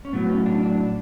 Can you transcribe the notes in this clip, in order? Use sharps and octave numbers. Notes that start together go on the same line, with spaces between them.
C#4
A2 F#3 B3
C#4
D4
D4